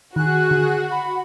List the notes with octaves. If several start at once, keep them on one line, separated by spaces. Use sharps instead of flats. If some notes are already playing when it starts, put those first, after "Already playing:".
D#3 F#4 G#4 F#6
D3
F#5 B5